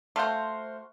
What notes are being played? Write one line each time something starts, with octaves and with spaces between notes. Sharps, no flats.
A3 F#4 C5 F5 C6